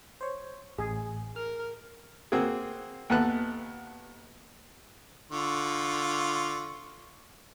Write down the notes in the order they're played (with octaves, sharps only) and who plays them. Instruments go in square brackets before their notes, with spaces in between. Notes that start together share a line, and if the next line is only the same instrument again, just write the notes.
[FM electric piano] C5 C#5
[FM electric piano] A1 [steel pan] G#4
[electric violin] A#4 [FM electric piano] F6
[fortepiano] A#3 C4 F#4 G#4
D#2 B3 A4 A5 F#6
[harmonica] D3 F4 C#6